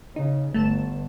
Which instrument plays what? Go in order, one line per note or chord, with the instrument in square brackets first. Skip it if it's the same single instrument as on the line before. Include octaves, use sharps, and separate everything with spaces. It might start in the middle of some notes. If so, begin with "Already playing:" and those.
[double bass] C#3 [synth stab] D#4
[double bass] G1 [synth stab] A3 A5 E7